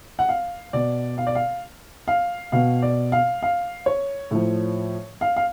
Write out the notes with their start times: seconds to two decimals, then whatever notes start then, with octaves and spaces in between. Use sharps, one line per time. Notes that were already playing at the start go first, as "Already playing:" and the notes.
0.19 F#5
0.29 F5
0.73 B2 D5
1.18 F5
1.27 D5
1.35 F5
2.08 F5
2.52 B2 F5
2.82 D5
3.12 F5
3.43 F5
3.86 C#5
4.31 A2 F3
5.21 F5
5.36 F5